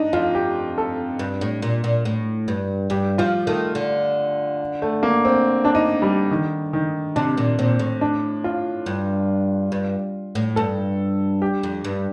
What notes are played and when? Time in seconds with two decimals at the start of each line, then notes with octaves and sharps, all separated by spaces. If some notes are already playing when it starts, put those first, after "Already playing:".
Already playing: D4 D#4
0.13 F2 F4
0.35 G4
0.78 A4
1.19 G2
1.41 A2
1.62 A#2
1.84 A#2
2.05 A2
2.48 G2
2.90 G2 G4
3.18 F3 F4
3.47 D#3 A3
3.75 D3
4.82 A3
5.03 A#3
5.25 C4
5.65 D4
5.75 D#4
6.02 G3
6.31 D#3
6.73 D#3
7.16 C3 D4
7.37 A#2
7.58 A#2 C4
7.79 A2
8.01 D4
8.44 F4
8.86 G2
9.72 G2
10.35 A2
10.56 G2 A4
11.42 G4
11.63 F2
11.84 G2